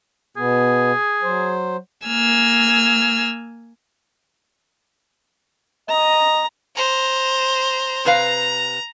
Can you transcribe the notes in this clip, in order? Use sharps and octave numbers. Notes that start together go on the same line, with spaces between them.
B2 B3 G#4
F#3 C5
A#3 G#5 E6 F6
D#5 A#5
C5 A#5
C3 B4 F5 A#5